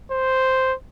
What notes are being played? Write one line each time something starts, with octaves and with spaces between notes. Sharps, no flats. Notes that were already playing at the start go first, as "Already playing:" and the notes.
C5